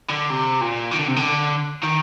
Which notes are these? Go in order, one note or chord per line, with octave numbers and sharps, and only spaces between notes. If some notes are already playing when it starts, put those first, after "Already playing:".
D3
C3
A#2
D#3
D3
C3
D3
D#3